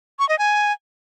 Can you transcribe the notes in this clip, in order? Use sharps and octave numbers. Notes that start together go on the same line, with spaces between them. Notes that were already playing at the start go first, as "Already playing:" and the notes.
C#6
D#5
G#5